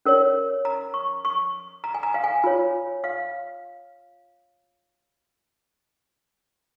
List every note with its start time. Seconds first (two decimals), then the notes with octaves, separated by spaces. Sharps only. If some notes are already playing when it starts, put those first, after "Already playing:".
0.05 C#4 A#4 C#5
0.65 A#5
0.94 C#6
1.25 C#6
1.84 A#5
1.94 G#5
2.03 A#5
2.14 F5
2.24 G#5
2.44 F4 C#5
3.04 F5